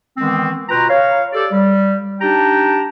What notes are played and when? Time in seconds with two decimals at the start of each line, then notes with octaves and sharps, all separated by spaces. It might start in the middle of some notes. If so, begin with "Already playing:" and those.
0.17 D#3 E3 G#3 B3 C4
0.69 B2 F4 B4 G5 A#5
0.89 C#5 F5
1.33 G4 A4 D5
1.52 G3
2.20 D4 D#4 G4 G5 A5 A#5